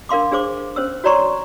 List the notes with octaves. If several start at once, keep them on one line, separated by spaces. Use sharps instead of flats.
D4 A#4 F5 C6 D6
D4 G#4 C5 D6
C#4 C5 E6
F#4 C#5 D5 A#5 C6 C#6